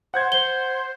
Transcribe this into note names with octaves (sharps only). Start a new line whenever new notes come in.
C5 F#5 G6 G#6
C5 G7